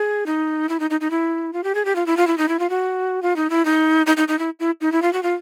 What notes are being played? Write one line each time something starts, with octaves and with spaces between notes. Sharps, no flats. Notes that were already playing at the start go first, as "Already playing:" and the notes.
Already playing: G#4
D#4
E4
D#4
D#4
D#4
E4
F4
G4
G#4
G4
F4
E4
F4
E4
D#4
E4
F4
F#4
F4
D#4
E4
D#4
D#4
D#4
D#4
E4
E4
D#4
E4
F4
F#4
F4